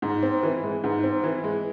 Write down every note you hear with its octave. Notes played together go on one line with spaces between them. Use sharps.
G#2
C4
E3
G#3
G#2
C4
E3
G#3